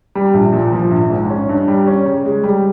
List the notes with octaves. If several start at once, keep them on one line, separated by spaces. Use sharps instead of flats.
G3
A#1
A#2
F3
A#1
G#2
C#4
G2
G3
C#4
C#3
G#3
G3